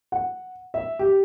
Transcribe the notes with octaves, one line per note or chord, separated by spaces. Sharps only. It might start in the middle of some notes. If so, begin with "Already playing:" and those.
F#5
E5
G4